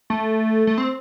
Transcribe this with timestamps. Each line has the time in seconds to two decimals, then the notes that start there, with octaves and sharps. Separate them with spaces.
0.10 A3
0.67 A3
0.78 C4